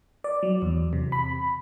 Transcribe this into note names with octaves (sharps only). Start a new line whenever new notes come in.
D5
F#3
E2
C3
B5